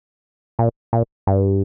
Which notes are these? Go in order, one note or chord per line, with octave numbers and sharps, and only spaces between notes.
A#2
A#2
G2